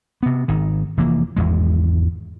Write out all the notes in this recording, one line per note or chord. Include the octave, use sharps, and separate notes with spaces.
C3 B3
G#1 D#3
F1 E3 A#3
G#1 E2 G#3